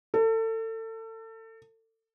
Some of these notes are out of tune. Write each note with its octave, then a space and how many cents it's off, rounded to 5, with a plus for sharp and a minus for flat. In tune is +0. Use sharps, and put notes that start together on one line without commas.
A4 +30